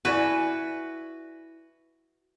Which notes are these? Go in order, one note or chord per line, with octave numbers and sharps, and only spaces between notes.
E4 F#4 B4 D5 G#5